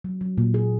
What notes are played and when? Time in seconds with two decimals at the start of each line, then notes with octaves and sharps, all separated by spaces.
0.04 F#3
0.21 F#3
0.38 A#2
0.54 G#4